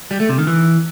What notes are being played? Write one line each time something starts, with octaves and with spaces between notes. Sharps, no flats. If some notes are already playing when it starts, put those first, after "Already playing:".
G3
A3
C3
D#3
E3